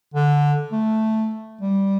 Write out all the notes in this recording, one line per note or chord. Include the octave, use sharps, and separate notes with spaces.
D3
A3
G3